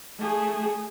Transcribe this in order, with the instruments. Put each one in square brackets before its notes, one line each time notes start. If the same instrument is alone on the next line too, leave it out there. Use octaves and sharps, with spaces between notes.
[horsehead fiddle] A3 G#4